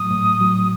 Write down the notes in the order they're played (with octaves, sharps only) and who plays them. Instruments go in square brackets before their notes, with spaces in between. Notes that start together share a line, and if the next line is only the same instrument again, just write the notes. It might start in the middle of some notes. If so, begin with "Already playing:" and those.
Already playing: [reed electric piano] A2 F#3 [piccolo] D#6
[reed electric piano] A2
F#3